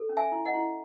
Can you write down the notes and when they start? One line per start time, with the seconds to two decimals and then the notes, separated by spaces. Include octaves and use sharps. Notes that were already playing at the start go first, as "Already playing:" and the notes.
Already playing: A4
0.09 C#4
0.17 E5 G#5
0.32 E4
0.45 D#5 F#5
0.54 E4